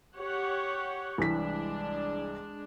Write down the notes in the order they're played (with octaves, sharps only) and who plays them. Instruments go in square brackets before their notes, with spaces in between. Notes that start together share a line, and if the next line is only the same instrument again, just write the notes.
[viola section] G4 C#5 F#5
[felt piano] C2 E3 B6 [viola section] G#3 D4